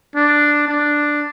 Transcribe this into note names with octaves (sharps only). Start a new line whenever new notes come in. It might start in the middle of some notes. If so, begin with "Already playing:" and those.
D4
D4